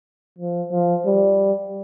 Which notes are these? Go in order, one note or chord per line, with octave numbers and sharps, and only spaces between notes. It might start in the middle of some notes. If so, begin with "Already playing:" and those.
F3
F3
G3